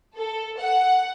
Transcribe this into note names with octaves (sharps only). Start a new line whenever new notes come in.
A4
F#5